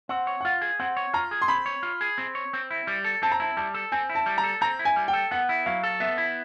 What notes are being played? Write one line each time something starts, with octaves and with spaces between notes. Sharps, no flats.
C4 F#5
C#5
F#5
F4 F5
G#4
C4 F#5
C#5
F4 A#5
G#4
C6
C4 B5
C#5
F4
G#4
C4
C#5
C4
E4
G3
A4
C4 A5
A#5
E4 A5
G3 A5
A4
C4 G#5
E4
A5
G3
A#5
A4
C4 A#5
E4
G#5
G3
G5
A4
B3 F#5
E4
F#3 F5
A4
B3 E5
E4